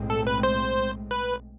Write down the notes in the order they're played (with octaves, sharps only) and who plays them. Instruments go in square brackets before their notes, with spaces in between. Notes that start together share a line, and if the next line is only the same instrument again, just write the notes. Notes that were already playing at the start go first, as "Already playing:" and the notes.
Already playing: [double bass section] B1 A2 G#3 C4
[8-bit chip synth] A4
B4
C5
B4